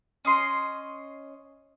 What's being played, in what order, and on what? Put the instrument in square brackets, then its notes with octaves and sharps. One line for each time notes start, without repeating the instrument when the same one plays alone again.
[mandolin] C#4 D#5 C6